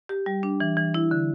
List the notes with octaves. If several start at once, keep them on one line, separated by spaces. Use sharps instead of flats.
G4
G3
D4
E3
E3
E4
D3